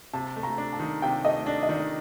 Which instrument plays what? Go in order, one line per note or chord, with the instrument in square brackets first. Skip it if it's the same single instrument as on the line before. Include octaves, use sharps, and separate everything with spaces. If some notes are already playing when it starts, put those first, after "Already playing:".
[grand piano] C3 [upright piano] A5
[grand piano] A3
[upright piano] A#5
[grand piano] D4
[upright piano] A5
[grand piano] D#3
[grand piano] C3 [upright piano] G5
[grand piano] A3 [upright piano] D#5
[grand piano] D4 [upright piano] D5
[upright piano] D#5
[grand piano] D#3 [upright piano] D5